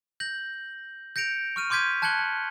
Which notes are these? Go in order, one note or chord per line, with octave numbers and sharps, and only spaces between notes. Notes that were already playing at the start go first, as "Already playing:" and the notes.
G6 A#6 F#7
G6 A#6 C#7 D7 F7
C#6 F6 D#7
C6 D6 G6 G#6 B6 D#7
A5 F#6 G#6 C#7 F#7 G7